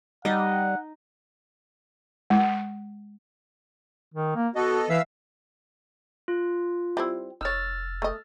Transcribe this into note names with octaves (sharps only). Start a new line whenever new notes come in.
G3 D#4 D#5 F#5
G#3
D#3
A#3
B3 F#4 A4 D#5
E3 E5 F5 E6
F4
G3 C4 E4
F1 D#4 C#5 E6 F6 A6
A3 D#5